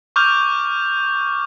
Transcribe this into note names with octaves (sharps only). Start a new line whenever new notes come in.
C#6 D6 F6 G6 F7